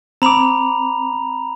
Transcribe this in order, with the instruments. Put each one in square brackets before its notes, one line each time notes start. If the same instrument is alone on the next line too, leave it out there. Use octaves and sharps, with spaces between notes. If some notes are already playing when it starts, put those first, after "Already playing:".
[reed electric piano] C4 D6 [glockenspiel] A#5 B5 F7